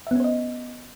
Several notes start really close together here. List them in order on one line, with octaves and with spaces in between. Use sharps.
E5 B3 C#4 C5 D#5